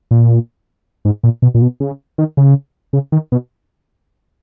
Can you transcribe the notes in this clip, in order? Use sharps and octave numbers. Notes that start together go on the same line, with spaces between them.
A#2
G#2
A#2
B2
A#2
B2
C#3
D#3
C#3
C#3
D#3
B2